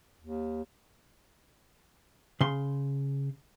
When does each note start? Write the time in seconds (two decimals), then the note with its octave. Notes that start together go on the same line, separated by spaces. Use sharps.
0.21 D#2
2.41 C#3 C6